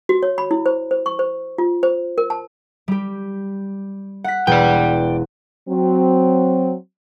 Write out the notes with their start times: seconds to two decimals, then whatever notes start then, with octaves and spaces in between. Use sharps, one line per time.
0.09 F#4
0.23 C#5
0.38 B5
0.51 E4
0.66 C5
0.91 C5
1.06 C#6
1.19 C5
1.58 F4
1.83 C5
2.18 A#4
2.30 A5
2.88 G3 G4
4.24 F#5 B6
4.47 E1 B4 D5 G5
5.69 F#3 C4